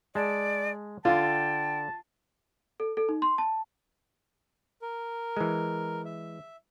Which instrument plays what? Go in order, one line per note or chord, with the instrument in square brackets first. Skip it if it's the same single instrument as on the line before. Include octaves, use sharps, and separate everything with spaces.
[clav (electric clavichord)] G#3 A5 [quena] D5
[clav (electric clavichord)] D3 [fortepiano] F4 [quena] G5 [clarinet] A5
[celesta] A4
A4
D#4
C6
A5
[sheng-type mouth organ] A#4
[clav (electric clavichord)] E3 G#3
[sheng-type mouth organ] E5